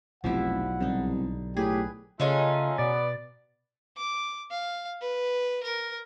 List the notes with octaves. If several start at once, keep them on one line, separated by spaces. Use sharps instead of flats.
F1 B1 G#2 F3 G3 E4 F#5
C2 D3 D#4
A2 G4 G#4 B4
C#3 G#3 A3 C#4 D#4 F4
B2 B3 D5 A6
D6
F5
B4
A#4